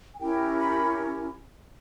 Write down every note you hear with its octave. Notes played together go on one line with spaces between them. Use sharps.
G#5
C#4 E4 G4 A#4 G5
B5